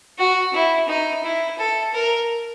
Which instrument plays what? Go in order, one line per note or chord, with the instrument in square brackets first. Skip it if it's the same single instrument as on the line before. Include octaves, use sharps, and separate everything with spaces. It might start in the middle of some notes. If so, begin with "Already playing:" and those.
[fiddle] F#4
E4
D#4
E4
A4
A#4